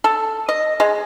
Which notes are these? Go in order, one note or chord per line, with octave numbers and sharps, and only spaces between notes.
A4
D#5
G#3